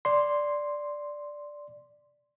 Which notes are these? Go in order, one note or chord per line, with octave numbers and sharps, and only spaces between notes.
D5 C6